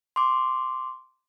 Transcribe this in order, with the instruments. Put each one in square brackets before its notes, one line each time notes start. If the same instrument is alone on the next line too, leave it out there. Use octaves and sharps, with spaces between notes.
[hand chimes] C6 D6